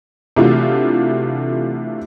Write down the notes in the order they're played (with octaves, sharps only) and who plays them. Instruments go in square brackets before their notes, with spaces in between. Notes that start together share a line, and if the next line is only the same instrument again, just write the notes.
[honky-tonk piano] C3 E3 A3 D4 F4 F#4